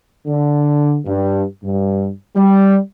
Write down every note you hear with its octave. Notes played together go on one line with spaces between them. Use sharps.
D3
G2
G2
G3